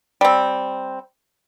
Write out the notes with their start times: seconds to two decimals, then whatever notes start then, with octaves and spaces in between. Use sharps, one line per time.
0.21 G3 C4